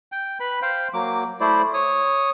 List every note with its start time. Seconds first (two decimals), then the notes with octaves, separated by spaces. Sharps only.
0.12 G5
0.40 B4 B5
0.62 C5 F5 G5
0.94 F#3 A#3 D6
1.40 A3 E4 C5 D5
1.74 C#5 D#6